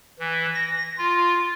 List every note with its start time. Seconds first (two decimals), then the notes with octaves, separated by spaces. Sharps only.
0.19 E3
0.55 A#6
0.98 F4